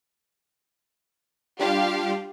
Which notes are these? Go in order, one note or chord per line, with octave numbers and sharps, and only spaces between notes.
G3 D4 F4 G4 F5